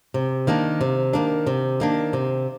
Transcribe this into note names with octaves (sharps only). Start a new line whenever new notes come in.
C3
D#3 A#3 D4
C3
D#3 A#3 D4
C3
D#3 A#3 D4
C3